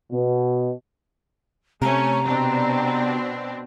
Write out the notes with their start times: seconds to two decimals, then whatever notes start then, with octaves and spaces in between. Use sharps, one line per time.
0.12 B2
1.82 C3 A3 C#4 A#5
2.25 B2 C4 D4